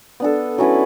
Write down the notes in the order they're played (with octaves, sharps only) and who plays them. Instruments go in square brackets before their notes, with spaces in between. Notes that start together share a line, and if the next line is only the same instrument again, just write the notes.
[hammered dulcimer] B3 D4 A4
F#3 C#4 E4 B4